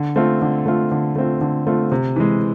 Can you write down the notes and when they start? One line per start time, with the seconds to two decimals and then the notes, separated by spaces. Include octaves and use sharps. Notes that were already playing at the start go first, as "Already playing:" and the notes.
Already playing: D3
0.16 A3 C4 F4
0.42 D3
0.66 A3 C4 F4
0.92 D3
1.16 A3 C4 F4
1.41 D3
1.66 A3 C4 F4
1.92 C3
2.16 E3 G#3